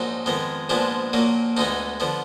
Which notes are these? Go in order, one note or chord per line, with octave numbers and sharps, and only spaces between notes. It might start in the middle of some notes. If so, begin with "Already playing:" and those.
Already playing: A#1 G#2 F#3 D#4
F2 D#3 G#3 B3
A#1 G#2 F3 G#3 B3 D4
A#1 A#2 F#3 A#3
D2 D3 G#3 B3 D#4
D3 F3 B3